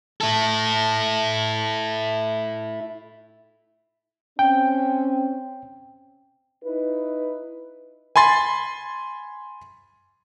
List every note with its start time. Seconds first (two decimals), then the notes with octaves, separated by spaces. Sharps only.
0.21 E4 A4
4.39 C4 C#4 G5
6.64 D#4 E4 B4
8.16 G#5 B5 C6 A6